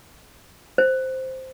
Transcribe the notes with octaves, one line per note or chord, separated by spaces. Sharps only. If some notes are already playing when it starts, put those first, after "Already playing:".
C5